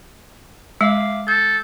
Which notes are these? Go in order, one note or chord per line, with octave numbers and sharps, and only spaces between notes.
G#3 E5 F5 D6
A4 G6